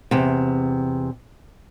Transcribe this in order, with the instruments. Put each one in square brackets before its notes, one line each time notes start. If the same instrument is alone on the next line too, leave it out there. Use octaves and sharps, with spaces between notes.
[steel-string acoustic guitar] E2 C3